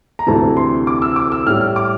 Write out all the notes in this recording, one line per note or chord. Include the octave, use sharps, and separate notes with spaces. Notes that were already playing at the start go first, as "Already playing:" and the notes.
A#5
D2 C3 E3 A5
C6
D6
E6
D6
E6
A2 G3 F6
F6
D6